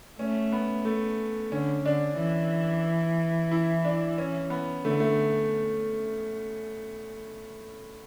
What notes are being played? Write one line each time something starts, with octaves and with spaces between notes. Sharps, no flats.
A3 C#4
B3
A3
D3 C#4
D3 D4
E3
E4
D4
C#4
B3
D3 A3
A3